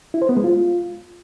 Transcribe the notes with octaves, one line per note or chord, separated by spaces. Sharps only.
E4
C5
B3
G#3
F4